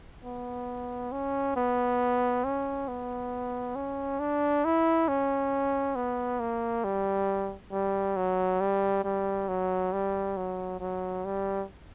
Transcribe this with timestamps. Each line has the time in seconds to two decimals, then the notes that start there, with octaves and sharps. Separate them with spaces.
0.24 B3
1.12 C#4
1.56 B3
2.44 C#4
2.88 B3
3.76 C#4
4.20 D4
4.65 E4
5.08 C#4
5.96 B3
6.40 A#3
6.84 G3
7.72 G3
8.16 F#3
8.61 G3
9.04 G3
9.48 F#3
9.92 G3
10.37 F#3
10.80 F#3
11.25 G3